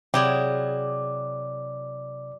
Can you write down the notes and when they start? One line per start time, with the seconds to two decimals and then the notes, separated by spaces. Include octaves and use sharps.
0.14 C3 F#3 E4 G4 G#4 D5 D6